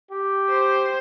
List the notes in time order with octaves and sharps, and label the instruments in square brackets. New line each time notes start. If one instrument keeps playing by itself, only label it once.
[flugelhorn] G4
[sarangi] C5